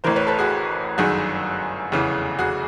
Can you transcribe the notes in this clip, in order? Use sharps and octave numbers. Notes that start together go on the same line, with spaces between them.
A1 A2 E3 A#4 C5
B4 C#5
A4 B4
F#4 G#4
G1 F#2 D#3 F#4 G#4
F1 E2 C#3 E3
F#4 G#4